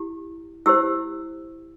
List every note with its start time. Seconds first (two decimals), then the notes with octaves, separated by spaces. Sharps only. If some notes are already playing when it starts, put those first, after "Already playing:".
Already playing: E4 G4
0.66 E4 G4 C5 E6